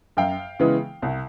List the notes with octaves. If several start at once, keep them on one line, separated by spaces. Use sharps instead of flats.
F#2 F5 G5
C#3 E3 G#3 B3
C2